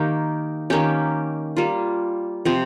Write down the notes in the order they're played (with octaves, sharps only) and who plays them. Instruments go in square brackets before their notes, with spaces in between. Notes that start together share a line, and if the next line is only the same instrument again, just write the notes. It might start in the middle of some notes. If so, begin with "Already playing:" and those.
Already playing: [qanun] D#3 A#3 D#4 G4
D#3 A#3 C#4 G4
G3 A#3 F4
C3 F3 C4